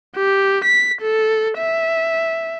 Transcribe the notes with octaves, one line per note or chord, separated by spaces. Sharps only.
G4
B6
A4
E5